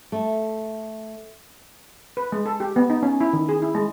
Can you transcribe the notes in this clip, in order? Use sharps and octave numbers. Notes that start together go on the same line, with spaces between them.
A3
B4
G#3
A4
G4
B3
D#4
C#4
E4
D#3
G#4
E4
G#3